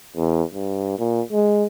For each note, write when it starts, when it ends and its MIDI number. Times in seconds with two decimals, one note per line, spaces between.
0.16 0.43 40
0.54 0.94 43
0.99 1.22 46
1.32 1.66 56